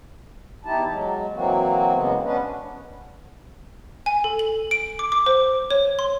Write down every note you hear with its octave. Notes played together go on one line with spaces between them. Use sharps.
E2 D#4 E4 G4 A5
F#3 G#3
E3 F#3 A#3 C4 F#4
C#3 G#3 B3
B3 C#4 D4 B4
G#5
A4
F#7
D7
D6
D6
C5
C#5
C6